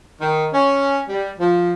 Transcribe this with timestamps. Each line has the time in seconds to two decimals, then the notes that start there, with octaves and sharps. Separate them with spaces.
0.20 D#3
0.54 C#4
1.09 G3
1.39 F3